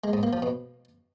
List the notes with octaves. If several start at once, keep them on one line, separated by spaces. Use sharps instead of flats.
G#3
G#2
A#3
F3
B2